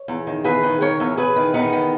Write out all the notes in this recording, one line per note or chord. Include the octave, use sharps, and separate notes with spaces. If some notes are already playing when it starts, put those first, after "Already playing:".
Already playing: C#5
E2
D#3
E2 G#4 B4
D#3
D#3 A#4 C#5
E2
E2 G#4 B4
D#3
E2 B3 D#4
D#3